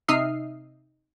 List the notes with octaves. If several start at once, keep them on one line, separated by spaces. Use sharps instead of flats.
C3 D#4 E5 D#6 F6 C7